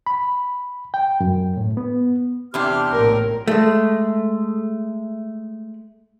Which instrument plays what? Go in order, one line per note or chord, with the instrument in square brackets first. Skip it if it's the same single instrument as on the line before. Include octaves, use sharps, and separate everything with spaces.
[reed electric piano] B5
G5
F#2
A2
B3
[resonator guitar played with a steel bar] E2 C3 D4 [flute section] G4 C6 F6
[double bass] A#1 A2 [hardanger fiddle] A#4
[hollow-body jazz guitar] G#3 A3